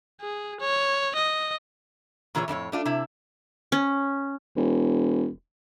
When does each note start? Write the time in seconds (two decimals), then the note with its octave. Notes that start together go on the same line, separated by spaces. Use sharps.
0.21 G#4
0.60 C#5
1.15 D#5
2.35 A#2 E3 F4 G#4 C5 C#5
2.48 F2 A2 E4 C#5
2.72 A3 D4 F4
2.85 C3 E4
3.72 C#4
4.56 E1